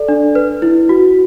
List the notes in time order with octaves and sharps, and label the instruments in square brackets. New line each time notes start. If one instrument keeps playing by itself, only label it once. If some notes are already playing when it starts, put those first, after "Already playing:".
Already playing: [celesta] A4 D5
D4
B4
E4
F#4